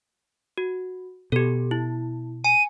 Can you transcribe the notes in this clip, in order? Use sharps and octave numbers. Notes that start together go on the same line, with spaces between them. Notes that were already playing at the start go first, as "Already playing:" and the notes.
F#4
B2 G4 A4
E4
G#5 D#7